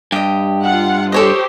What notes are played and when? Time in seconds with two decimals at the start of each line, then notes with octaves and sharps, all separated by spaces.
0.12 G2 G4 D#5
0.65 F4 F#5
1.12 G4 A4 C5 C#5 D#5